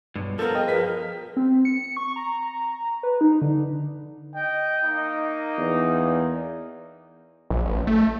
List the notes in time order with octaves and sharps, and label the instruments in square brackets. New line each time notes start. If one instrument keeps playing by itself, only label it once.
[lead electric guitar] B1 G2
[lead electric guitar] F3 [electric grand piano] B3 A4 [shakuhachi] A#4
[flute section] G#4 [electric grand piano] D#5 G5 D#6
[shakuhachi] A#4 [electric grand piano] B4 B6
[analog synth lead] C4
C#7
C#6
A#5
B4
D#4
D3
[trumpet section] D#5 G5
A#3 D#4
[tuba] E2
[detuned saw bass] A#1
A1
A3